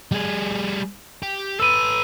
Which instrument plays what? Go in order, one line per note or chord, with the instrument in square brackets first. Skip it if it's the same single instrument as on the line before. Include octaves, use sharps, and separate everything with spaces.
[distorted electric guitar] G3 G#4
G4
[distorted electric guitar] A4 B4 [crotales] E6 D#7